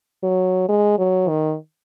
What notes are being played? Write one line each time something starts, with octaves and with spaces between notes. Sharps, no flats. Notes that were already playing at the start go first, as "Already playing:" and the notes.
F#3
G#3
F#3
D#3